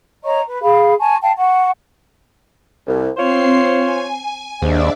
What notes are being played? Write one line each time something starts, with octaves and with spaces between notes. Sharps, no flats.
C#5 D#5 A#5 C#6
B4
G#4 F5 B5
G#5 A5 C#6
F5 G5 A5
F#5 C#6
C2
C4 F4 C5 C#5 C7
G#5
D#2 G#2 D4 D5 E5